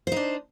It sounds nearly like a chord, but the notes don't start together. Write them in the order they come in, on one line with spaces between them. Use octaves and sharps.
C5 D#4 D4